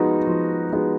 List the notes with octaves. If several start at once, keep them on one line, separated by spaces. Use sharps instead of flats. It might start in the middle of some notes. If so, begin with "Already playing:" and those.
Already playing: F3 G#3 B3 D#4 F#4
F3
G#3 B3 D#4 F#4